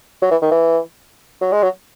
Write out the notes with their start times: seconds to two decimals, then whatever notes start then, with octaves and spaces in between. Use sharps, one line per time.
0.22 F#3
0.31 E3
0.42 D#3
0.52 E3
1.42 F#3
1.52 G#3
1.63 F#3